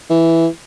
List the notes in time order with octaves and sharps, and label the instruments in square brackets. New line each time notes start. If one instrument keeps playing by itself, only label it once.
[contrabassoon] E3